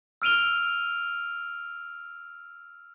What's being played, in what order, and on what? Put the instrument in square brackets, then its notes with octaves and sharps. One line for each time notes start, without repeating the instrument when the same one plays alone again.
[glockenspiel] E6 F6 D7 D#7 F7 G7